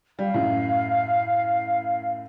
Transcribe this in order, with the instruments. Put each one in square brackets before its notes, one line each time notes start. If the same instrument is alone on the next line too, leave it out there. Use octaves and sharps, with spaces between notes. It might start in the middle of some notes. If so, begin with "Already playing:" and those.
[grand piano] G3 [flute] F5
[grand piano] F#2 A2